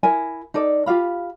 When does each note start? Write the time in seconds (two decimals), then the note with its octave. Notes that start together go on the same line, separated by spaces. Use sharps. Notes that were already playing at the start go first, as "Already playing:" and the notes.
0.03 E4 A#4 G#5
0.54 D#4 A4 D5
0.86 F4 G4 F5 B5